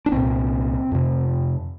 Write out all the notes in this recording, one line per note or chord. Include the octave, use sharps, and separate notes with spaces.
D4
C2 A#2 C4
F2 C3